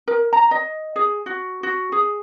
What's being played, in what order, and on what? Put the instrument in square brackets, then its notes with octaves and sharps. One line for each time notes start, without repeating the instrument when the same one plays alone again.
[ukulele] A#4
A#5
D#5
G#4
F#4
F#4
G#4